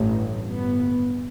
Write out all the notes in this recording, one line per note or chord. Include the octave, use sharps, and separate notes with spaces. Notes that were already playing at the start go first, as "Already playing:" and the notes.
Already playing: A1 G2
G1 G2 B3